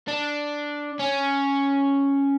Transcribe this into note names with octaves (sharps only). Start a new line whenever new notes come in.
D4
C#4